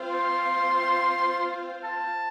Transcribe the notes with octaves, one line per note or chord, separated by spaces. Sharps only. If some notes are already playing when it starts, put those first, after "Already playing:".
Already playing: C4 F4 C5 F5
C6
A5